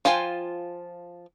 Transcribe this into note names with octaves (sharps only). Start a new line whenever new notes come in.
F3 F4 G5 G#5